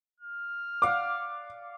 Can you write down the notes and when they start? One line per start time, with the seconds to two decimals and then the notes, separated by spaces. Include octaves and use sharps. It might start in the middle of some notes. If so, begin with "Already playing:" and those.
0.20 F6
0.82 D5 F5 F#5 D6